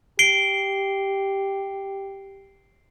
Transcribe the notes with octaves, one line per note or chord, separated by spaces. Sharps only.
G4 C7 D7 G7